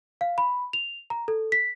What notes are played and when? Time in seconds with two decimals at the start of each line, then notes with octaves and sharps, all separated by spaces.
0.21 F5
0.38 B5
0.73 F7
1.10 A#5
1.28 A4
1.52 B6